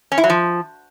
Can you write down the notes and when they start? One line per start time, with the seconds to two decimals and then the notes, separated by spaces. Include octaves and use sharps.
0.12 C#4
0.18 E4
0.24 F#3
0.30 F3